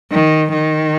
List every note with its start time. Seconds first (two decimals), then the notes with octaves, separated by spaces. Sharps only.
0.12 D#3
0.53 D#3